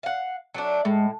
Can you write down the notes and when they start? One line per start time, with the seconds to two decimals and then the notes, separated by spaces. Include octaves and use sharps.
0.03 F5 F#5
0.54 F#3 A3 D4
0.85 A2 G#3